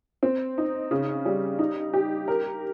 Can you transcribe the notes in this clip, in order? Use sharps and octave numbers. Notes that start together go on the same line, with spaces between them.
C4
D#4
C#3
G3
D#4
G4
A#4